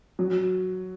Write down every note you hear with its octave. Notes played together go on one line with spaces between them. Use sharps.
F#3